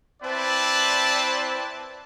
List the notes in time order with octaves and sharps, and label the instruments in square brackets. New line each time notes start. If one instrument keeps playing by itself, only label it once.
[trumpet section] C4 E4 B4 D5 A5